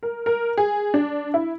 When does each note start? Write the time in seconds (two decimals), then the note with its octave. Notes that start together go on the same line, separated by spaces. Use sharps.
0.03 A#4
0.26 A#4
0.57 G#4
0.94 D4
1.34 E4